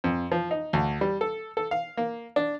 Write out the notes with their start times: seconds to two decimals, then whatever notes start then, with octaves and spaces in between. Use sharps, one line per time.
0.04 F2
0.32 F3
0.51 D#4
0.73 D2
1.01 G3
1.21 A4
1.57 A4
1.71 F5
1.97 A#3
2.36 D4